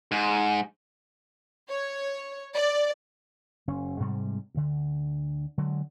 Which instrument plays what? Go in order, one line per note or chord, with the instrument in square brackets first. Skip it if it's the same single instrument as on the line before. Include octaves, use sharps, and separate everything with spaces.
[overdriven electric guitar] G#2
[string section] C#5
D5
[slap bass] F#1 C#4
G#2 C3 G3 G#3
D2 D3
D3 F#3 G#3